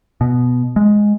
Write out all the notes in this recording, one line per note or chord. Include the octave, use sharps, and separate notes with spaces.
B2
G#3